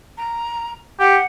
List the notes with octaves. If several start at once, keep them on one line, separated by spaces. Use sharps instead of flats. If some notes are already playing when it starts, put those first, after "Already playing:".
A#5
G4 F#5